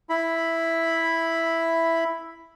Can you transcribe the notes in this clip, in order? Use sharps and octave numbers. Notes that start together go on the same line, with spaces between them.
E4 B5